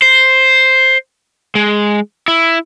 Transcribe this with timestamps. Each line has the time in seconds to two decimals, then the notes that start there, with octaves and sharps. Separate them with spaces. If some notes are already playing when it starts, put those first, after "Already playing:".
0.02 C5
1.55 G#3
2.28 E4